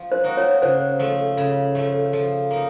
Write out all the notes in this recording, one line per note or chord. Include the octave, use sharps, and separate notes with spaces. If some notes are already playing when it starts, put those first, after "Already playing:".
Already playing: F3
C5
A#3 D#4 F#4
C#5
C#3 C5
F3 A3
C#3
F3 A3
F3
A#3 D#4